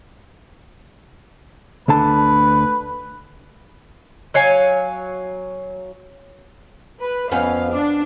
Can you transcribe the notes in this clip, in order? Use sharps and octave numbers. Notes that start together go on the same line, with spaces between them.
D2 D3 B4 A5
F#3 C#5 F5 G#5
B4
F2 B3 C#4 F5
D4